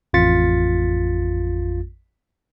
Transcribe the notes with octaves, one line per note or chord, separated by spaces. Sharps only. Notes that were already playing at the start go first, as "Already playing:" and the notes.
A1 F2 F4 A6 B6 C#7